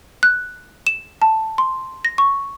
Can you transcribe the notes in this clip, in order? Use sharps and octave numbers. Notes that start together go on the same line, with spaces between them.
F#6
E7
A5
C6
A#6
C#6